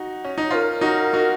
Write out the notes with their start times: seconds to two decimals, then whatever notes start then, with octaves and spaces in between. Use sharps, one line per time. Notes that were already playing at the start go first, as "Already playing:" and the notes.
Already playing: D#4 F#4
0.24 C#4
0.38 D#4
0.50 C#4 F4 A#4 C5
0.81 D#4 F#4
1.13 D#4 F#4